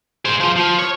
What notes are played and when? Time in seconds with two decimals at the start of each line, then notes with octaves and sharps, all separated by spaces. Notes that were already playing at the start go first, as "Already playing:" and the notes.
0.25 G#4 C5
0.40 F3 C5
0.56 F3
0.79 C#5